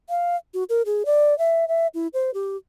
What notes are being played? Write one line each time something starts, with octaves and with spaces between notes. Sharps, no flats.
F5
F#4
A#4
G#4
D5
E5
E5
E4
C5
G4